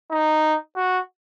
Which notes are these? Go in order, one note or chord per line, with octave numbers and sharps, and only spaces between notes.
D#4
F#4